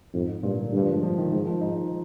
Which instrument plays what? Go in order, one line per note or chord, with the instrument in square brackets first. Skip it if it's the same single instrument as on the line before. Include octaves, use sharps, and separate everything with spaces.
[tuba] F2 [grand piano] G#2
[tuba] G2 [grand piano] A#2
[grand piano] D3
[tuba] G2 [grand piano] D3
[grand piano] F3
G#3
F3
D#3
[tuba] G#2 [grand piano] D#3
[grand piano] F3
[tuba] G#2 [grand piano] D#4